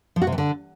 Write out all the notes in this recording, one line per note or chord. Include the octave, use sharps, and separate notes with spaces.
F3
F#4
C3
E3
D3